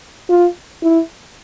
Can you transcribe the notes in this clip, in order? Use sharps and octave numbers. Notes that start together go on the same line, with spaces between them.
F4
E4